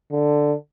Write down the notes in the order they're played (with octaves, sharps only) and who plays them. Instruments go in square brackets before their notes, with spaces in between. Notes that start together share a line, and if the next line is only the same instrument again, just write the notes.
[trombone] D3